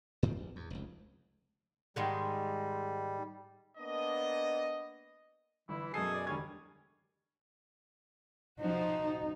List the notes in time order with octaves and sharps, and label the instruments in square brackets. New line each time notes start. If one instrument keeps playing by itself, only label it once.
[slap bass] G#2 D#3 F3 C4
A#1
E2
F1 C#2
[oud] G#2 D#3 G#3 [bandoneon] G3
[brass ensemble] A#3 B3 D4 D#5
[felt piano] G1 [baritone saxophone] E3 [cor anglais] E4
[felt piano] F#2 C7 [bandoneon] B2 G#5 [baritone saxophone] G#4 [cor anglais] A4
[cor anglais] D5
[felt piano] E1 D3 G#6 [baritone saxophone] G3 [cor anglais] C#4
[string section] F3 F#4 C5 [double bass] D#4